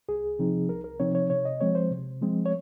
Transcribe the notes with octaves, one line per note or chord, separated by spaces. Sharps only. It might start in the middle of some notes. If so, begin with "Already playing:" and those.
C2 G#4
C3 F3 C4 D#4
C2 A#4
A#4
C3 F3 C4 D#4 C#5
C#5
C3 C#5
D#5
F3 G#3 C4 C#5
C5
C3
F3 G#3 C4
C#5